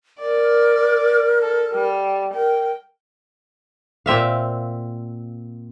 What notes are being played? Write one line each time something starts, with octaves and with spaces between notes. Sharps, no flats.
A#4 D5
A4
G3
A#4 G5
A#2 C4 E5 F5